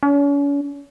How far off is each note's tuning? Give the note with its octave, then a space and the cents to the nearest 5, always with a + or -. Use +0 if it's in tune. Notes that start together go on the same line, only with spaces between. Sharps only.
C#4 +40